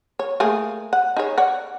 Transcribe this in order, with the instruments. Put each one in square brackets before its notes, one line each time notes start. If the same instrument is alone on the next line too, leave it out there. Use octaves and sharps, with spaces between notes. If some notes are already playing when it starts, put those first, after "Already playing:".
[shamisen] C#5
A3 A#3 G#4
F#5
D#4 G#4 C#5
C#5 D5 F#5